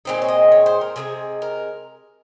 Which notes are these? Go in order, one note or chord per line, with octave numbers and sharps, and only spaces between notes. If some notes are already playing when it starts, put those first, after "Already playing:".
A#2 G#3 C4 D#4
C#5
D#5
C#5
C5
A#4
C3 F3 G#3 G#4
A#4